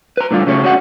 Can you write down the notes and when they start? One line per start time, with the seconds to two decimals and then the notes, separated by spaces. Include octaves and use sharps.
0.17 B4 A#5
0.31 A2 D3 G3 F4
0.47 C#3 F#3 A3 C#4 C#5
0.63 C#4 F#4 D5 F#5